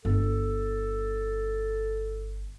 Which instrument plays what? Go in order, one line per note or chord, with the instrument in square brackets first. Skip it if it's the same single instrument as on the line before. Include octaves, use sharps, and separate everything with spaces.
[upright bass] G1 [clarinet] A4